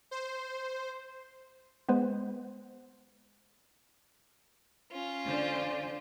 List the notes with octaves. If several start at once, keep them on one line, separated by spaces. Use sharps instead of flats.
C5
G#3 B3 B4 C5
C#4 F4
D3 C5 D5